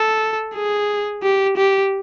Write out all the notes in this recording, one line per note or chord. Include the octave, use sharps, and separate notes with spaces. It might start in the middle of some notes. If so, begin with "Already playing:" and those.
Already playing: A4
G#4
G4
G4